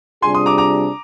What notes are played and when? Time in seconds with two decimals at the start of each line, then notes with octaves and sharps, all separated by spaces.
0.22 C3 G3 D4 F4 G#4 G#5 C6
0.34 C6 D#6
0.46 A#5 D6
0.58 A#5 D6